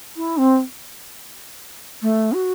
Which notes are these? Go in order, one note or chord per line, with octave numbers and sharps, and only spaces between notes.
E4
C4
A3
F#4